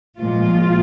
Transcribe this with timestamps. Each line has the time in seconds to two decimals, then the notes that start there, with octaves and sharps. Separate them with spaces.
0.18 A#2 F3 G#3 F4